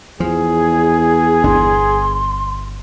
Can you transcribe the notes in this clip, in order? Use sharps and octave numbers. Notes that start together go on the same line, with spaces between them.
E2 F3 G#4
G1 D4 C6